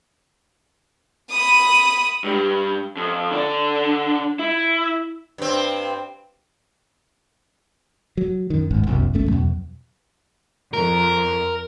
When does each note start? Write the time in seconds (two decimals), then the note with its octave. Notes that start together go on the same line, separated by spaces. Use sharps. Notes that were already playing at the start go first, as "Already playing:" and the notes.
1.31 B5 D#6
2.24 G2 G3
2.97 F2
3.31 D3 D4
4.39 E4
5.38 G2 C4
8.17 F#3
8.50 F#2 D#3
8.71 D#1 G#1 G#2
8.87 F#1 C2 F#2 B2
9.14 G1 C#2 A3 C#4
9.28 E2 B2 F#3
10.74 F2 A#4